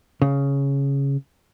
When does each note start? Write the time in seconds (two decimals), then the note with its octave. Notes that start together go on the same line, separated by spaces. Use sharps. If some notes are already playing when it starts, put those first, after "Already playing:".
0.22 C#3